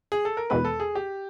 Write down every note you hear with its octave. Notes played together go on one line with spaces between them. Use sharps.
G#4
A4
A#4
E2 B2 G#3 B3 B4
A4
G#4
G4